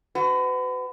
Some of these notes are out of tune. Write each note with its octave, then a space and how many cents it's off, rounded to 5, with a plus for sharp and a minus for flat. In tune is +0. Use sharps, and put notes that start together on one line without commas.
F#4 +15 B4 +40